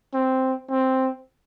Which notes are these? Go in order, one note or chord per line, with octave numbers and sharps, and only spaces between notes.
C4
C4